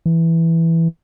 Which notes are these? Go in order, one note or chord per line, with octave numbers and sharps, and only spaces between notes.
E3